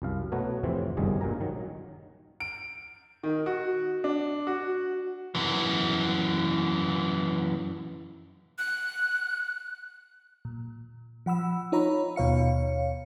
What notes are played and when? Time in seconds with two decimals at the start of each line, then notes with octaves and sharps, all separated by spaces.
0.02 C2 F#2 F5
0.32 B2 A3 B3 F#4 C#5 A#5
0.63 F2 A2 C3 E3 C4
0.97 G1 C2 F#2 D#3 G3 G#4
1.21 G2 A#2 G#5 A#5
1.40 D#3 F#3
2.40 D7
3.23 D#3
3.46 F#4
4.04 D4
4.47 F#4
5.35 F#2 E3
8.59 F#6
10.45 A#2
11.26 F3 F#5 B5 E6
11.72 D#4 F4 C#5 A#5 B5
12.16 D#2 B2 C#5 F5 C#7